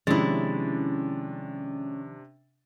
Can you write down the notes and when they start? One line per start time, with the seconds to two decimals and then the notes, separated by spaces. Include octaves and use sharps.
0.07 C3 D#3 F3 G#3 C#4 D4 E4 A6